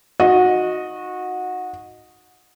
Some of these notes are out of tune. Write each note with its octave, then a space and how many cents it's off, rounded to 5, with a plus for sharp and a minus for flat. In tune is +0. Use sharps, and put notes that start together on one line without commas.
D#4 +0 F#4 -20 D#5 +0